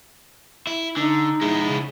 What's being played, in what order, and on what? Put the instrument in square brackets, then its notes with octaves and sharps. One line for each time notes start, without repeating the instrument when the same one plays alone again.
[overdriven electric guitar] E4
[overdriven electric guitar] D3 [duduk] D#4
[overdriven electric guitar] G#3 E4
[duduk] C#3